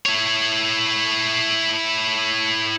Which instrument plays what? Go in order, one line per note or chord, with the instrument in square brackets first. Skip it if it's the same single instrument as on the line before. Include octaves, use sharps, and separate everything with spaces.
[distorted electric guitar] E4 C#5